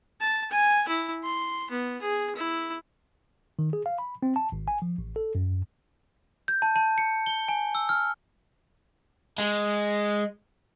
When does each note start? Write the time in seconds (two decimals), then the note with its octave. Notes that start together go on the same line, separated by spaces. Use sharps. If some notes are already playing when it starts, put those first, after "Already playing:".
0.20 A5
0.51 G#5
0.88 E4
1.23 C6
1.71 B3
2.01 G#4
2.35 E4
3.59 D#3
3.73 G#4
3.86 F5
3.98 B5
4.23 C4
4.36 A5
4.52 G#1
4.68 G#5
4.82 F3
4.98 A1
5.16 A4
5.35 F#2
6.48 G6
6.62 A5
6.76 A5
6.98 C#7
7.26 G7
7.48 G#5
7.75 E6
7.89 F6
9.38 G#3